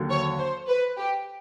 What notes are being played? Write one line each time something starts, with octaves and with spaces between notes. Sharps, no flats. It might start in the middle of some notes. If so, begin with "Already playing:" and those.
Already playing: D#2 D3 F#3 A#3
C#5
C5
B4
G4